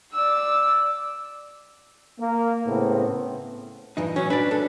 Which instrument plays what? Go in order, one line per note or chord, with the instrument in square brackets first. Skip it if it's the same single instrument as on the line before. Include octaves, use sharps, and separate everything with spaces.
[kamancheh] D5 E6
[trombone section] A#3
A2 C#3 B3 C4
[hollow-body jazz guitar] G2 E3 D#4
[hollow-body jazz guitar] F#3 [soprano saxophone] C#4
[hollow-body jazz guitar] D4 D5 [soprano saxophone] B4
[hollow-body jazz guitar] D4 [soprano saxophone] A4